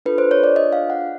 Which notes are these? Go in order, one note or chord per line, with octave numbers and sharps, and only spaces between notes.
D4 F4 A4 B4
C5
C#5
D5
D4 F4 G#4 D#5
F5
F#5